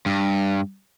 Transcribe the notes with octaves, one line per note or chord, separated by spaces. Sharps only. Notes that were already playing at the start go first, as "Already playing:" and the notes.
G2